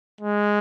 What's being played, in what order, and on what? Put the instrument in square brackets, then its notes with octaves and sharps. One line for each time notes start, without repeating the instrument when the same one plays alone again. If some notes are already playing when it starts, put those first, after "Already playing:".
[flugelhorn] G#3